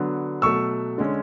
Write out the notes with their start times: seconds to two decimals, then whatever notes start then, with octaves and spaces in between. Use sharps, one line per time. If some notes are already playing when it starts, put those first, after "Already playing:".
Already playing: D3 F#3 B3
0.42 B2 F#3 A3 C#6 E6
0.98 D3 G#3 C#4